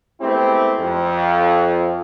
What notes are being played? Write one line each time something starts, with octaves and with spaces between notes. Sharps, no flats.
G#3 A3 B3 C4 E4 G4
F2